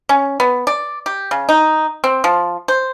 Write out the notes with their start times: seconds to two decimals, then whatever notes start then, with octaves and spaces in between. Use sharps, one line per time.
0.09 C#4
0.40 B3
0.67 D5
1.06 G4
1.31 C#3
1.49 D#4
2.04 C4
2.24 F3
2.68 C5